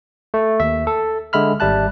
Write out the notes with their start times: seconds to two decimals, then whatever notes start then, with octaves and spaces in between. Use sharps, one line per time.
0.34 A3
0.60 D#2 E5
0.87 A4
1.33 D3 G#3 E5 B5 F6
1.60 G#1 G3 E5 A5 F#6